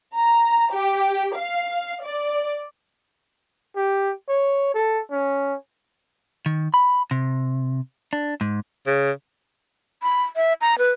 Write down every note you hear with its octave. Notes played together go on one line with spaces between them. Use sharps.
A#5
G4
F5
D5
G4
C#5
A4
C#4
D#3
B5
C3
D4
G#2
C#3
B5
E5
A#5
B4